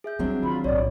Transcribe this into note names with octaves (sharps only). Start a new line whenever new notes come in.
G#4 E5 G6
F#3 G3 C4 D4 E4
D#3 F4 B5
B1 A2 C#5 D5